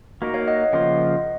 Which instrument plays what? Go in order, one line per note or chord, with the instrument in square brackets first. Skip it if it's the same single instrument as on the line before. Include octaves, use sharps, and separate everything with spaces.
[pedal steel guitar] A#3 D#4 A#4 [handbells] F#4
[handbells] C#5 F5
D#5 F#5
[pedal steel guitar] C#3 F3 A#3 F4 C5 [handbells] D#5 F#5